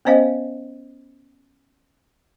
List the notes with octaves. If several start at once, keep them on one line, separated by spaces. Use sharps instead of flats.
B3 C#4 C5 D#5 F5